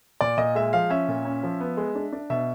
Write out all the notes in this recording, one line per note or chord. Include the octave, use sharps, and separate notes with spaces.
A#2 D5
A#2 D#5
G#3 E5
F3 F5
C#4 E5
A#2
C#4
F3
B3
G#3
D4
D4
B2 E5